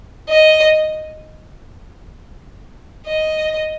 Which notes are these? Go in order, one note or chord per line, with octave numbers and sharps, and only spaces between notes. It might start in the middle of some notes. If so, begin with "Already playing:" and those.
D#5
D#5